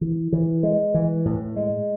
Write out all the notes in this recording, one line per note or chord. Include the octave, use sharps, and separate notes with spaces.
E3
E3
G#3
E3
A2
G#3